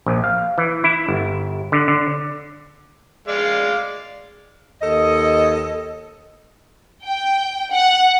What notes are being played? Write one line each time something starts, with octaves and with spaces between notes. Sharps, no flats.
A#1
F5
E3
E4
G1
D3
D3
G#3 D5 F5
D#2 A4 D#5
G5
F#5